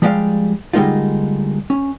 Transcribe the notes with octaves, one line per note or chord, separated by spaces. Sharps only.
F3 G3 G#3 D5 F5
D3 G3 G#3 A#3 D#4 F4
C#4